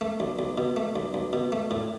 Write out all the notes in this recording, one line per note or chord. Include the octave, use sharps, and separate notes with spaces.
A3
B1
B1
B2
A3
B1
B1
B2
A3
A2